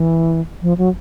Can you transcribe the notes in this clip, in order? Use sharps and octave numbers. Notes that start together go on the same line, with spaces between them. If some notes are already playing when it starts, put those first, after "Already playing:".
Already playing: E3
F3
F#3